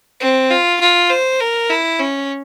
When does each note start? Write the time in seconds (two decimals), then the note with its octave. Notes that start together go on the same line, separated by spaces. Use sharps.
0.20 C4
0.51 F4
0.80 F4
1.10 C5
1.40 A#4
1.70 E4
1.99 C#4